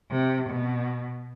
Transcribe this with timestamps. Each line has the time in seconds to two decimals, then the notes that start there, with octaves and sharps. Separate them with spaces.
0.11 C3
0.50 B2